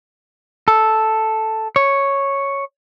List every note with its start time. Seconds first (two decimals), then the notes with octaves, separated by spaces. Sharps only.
0.68 A4
1.76 C#5